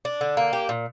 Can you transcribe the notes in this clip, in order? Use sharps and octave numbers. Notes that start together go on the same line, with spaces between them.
D4
D3
A#3
G4
A#2